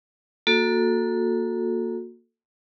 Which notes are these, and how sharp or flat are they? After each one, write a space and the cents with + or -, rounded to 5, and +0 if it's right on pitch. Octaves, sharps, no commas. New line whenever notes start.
A#3 +0 F#4 -30 A4 +0